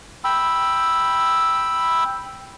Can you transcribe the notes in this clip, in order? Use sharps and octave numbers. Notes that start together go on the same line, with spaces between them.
G5 B5 E6